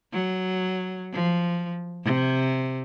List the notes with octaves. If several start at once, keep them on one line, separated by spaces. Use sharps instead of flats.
F#3
F3
C3